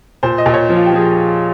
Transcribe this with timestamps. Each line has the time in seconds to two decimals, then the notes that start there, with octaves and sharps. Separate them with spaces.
0.23 A#2 C5
0.38 D#5
0.46 A#2
0.54 C#5
0.69 F3
0.76 F4
0.86 G4
0.93 F3 G#4